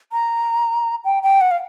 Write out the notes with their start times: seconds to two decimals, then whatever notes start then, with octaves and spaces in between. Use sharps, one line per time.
0.12 A#5
1.05 G5
1.23 G5
1.41 F#5
1.51 F5